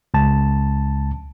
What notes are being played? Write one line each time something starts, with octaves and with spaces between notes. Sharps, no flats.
C#2 A5